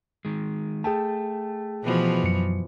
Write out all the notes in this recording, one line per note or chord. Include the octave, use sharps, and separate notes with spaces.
D#3 G#3
A3 G#4 G5 A5
B2 E3 F3
F#2 F#3 C#7